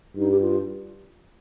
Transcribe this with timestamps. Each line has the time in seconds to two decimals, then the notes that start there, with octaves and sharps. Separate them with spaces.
0.17 G2 D#4
0.31 G4
0.41 F4